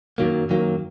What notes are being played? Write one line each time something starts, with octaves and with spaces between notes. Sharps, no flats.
F#2 D#3 F#3 A#3
F#2 D#3 F#3 A#3